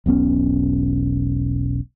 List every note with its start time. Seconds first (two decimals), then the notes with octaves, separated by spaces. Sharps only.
0.06 E1 B1 B3 C#4